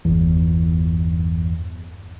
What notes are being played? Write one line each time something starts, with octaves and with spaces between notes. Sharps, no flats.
G1 E2